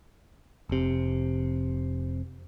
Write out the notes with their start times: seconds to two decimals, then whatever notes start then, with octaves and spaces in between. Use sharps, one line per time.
0.69 F1 C3